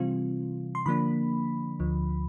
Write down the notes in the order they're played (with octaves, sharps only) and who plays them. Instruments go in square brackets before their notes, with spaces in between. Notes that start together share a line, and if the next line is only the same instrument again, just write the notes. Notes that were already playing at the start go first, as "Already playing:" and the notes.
Already playing: [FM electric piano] C3 E3 G3 C4 F4
C6
D3 F3 A#3 D4 B5
D2 D3 F3